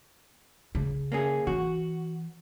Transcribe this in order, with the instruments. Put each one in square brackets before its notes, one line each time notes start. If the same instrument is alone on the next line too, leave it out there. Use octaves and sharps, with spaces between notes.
[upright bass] C#3
[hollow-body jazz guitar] A#3 C#4 G#4
[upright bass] E3 [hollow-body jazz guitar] F#4